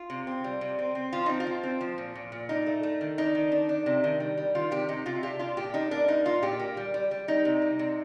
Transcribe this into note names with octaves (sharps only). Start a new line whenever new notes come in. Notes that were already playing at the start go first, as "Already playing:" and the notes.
Already playing: F4
C3
C4
G3
C3
C4
C4
F3 F4
C4 D#4
F4
F3
C4
F3
A#2
A#2
A#2
D4 D#4
A3
A3
D#3
D4 D#4
D#3
D4
D4
C3
D#3
G3
G3
D#3 F4
C3 G4
C3 D#4
C3 F4
D4 G4
D4 F4
A#2 G4
D4 D#4
A#3 D4
A#3 D#4
A#2 F4
A#2 G4
A#3
G3
G3
G3
G3 D#4
C3
G3
C3